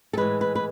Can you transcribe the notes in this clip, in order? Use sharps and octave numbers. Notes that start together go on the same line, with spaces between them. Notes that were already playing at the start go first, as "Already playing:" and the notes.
A4
A2 E3 G#3 B4
B4
B4